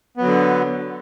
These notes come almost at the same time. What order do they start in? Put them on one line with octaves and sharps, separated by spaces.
B3 F#3 D3